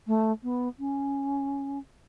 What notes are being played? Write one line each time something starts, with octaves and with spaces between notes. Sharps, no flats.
A3
B3
C#4